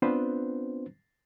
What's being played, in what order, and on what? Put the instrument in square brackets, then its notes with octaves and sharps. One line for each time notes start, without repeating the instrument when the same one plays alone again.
[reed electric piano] B3 C4 D4 F4 B4 C5